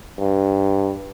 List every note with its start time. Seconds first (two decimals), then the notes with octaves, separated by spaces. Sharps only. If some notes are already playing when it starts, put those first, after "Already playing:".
0.19 G2